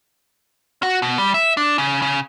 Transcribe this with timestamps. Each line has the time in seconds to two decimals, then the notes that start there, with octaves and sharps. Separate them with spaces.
0.83 F#4
1.02 B2
1.18 G3
1.34 E5
1.57 D4
1.78 C#3
2.02 C#3